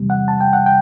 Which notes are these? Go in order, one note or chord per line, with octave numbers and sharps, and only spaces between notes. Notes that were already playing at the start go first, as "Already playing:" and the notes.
Already playing: E2 C3 G3
F#5
A5
G5
F#5
G5